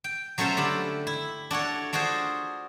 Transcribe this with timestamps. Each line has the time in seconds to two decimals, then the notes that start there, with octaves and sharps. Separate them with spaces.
0.04 G5
0.38 F#3 A3 C#4 F4 C5 E5
0.57 D3 G4 B5
1.07 E4
1.51 D4 F#4 A4 C#5
1.93 D4 F4 F#4 G#4 C5